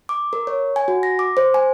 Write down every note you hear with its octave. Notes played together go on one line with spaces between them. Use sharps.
D6
A#4
C#5
G#5
F#4
A#6
D6
C5
G#5